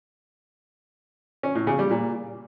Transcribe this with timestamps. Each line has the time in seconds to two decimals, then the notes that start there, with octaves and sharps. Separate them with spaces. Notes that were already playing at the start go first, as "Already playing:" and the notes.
1.43 C#4
1.55 A2
1.67 C#3
1.79 G3
1.91 A#2